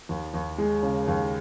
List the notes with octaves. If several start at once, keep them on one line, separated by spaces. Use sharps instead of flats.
D#2
D#2
G#3
C#3
D#2